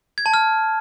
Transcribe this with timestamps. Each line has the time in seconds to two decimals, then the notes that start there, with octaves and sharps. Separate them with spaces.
0.18 G#6
0.26 A5
0.34 F6